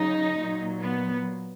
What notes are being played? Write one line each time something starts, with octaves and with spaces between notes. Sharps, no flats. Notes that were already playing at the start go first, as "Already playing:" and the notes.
Already playing: C#3 F#3 D#4
A#2 F#3
B3